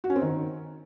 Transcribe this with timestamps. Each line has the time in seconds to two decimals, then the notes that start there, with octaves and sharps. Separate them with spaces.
0.04 F#4
0.10 C#4
0.16 C4
0.22 D#3